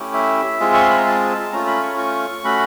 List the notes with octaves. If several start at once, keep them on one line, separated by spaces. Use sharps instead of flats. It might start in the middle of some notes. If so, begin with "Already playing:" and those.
Already playing: A3 C#4 E4 G4
E5
G#3 C4 F4 G#4
C#6
C6
B5
A#5
A5
A3 C#4 F4 A#5
B5
C#6
C#6
A3 C#4 F#4 B5